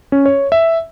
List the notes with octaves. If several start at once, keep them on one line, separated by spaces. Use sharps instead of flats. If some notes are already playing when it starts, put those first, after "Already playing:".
C#4
C#5
E5